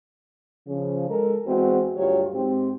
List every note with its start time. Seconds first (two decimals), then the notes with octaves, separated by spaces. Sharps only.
0.68 C#3 F3
1.09 G#3 A4 A#4
1.46 E2 G#3 C4 F#4
1.97 D2 G2 F#3 F4 G4 C#5
2.34 G#2 C4 G4